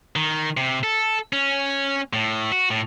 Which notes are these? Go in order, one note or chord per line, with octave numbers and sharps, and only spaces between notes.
D#3
C3
A4
C#4
A2
F#4
A2